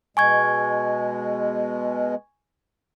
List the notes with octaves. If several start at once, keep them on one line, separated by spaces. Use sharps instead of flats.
B2 G#3 G#5 C#6 G#6